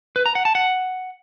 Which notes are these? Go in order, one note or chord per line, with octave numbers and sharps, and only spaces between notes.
B4
A#5
F#5
A5
F#5